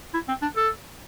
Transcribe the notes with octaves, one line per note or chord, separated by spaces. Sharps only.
E4
C4
D4
A4